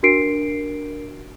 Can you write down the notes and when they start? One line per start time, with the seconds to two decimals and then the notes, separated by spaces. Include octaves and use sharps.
0.03 D4 F#4 A#4 C7 D7